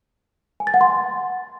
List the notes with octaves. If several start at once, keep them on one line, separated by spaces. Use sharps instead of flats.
G#5
A6
F#5
C6